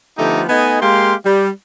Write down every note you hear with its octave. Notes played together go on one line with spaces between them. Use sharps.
D3 F3 A3 B3 D#4 G4
A3 B3 D#4 D#5 G#5
G#3 A#3 G4 F5 C6
G3